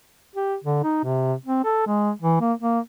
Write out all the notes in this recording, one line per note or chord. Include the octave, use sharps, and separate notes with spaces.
G4
D3
D#4
C3
C4
A4
G#3
E3
A#3
A#3